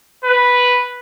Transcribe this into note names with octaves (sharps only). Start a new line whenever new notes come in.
B4